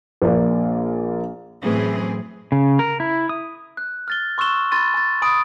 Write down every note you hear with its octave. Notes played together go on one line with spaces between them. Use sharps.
A#1 A#3 D5
F#2 A2 E3 C4 C#4 G#4
C#3
A#4
E4
D#6
F#6
F6 A6 G7
C6 C#6 E6 F#6 E7 G7
B5 C6 A6 D#7
G#5 A6
G#5 B5 D#6 D7